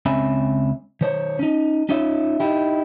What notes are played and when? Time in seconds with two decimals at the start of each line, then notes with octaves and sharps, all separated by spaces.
0.06 C#2 C4 C#4 E5 G#5 B5
1.01 D#3 C5 C#5
1.39 C#4 D#4
1.89 C#4 D#4 F4 C#5 E5
2.40 D#4 E4 G4